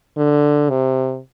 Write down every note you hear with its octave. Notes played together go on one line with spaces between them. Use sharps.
D3
C3